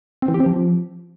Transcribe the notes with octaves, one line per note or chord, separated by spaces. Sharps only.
C4
E3
G4
C4
F3